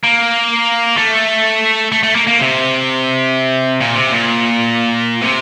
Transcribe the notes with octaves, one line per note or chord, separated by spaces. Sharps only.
A#3
A3
A3
A3
A#3
A#3
C3
A#2
C3
A#2
C3